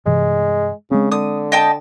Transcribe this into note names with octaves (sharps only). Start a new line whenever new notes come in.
G2 C3 E3 G#3
C#3 G#3 C4
D3 D#6
D#5 G5 A5